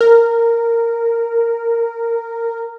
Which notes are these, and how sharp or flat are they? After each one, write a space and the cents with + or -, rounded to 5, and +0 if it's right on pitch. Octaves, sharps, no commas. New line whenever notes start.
A#4 -10